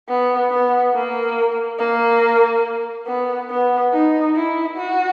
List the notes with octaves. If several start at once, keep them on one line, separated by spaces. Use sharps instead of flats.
B3
B3
A#3
A#3
B3
B3
D#4
E4
F#4